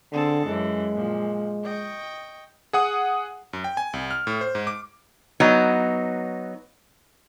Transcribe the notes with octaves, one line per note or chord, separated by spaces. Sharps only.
D3 C4 G#4 A4
F#2 E3 G#3
A#2 F3
D#5 G5 C#6
G#4 F#5 D#6
F#2
G5
G#5
C2
F6
A2
C5
G#2
D6
F#3 B3 D#4